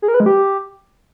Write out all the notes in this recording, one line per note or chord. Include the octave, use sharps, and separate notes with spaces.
G#4
A#4
B4
G#3
G4